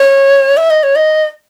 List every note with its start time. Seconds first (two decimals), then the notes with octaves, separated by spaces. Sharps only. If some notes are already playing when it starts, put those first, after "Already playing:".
Already playing: C#5
0.57 E5
0.70 D#5
0.83 C#5
0.96 D#5